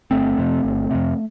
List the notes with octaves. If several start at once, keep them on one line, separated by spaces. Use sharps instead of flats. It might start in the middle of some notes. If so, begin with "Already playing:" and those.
G1 A3 C4
F2 C3
G1
F2 C3